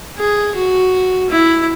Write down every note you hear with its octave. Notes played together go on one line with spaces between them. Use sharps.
G#4
F#4
E4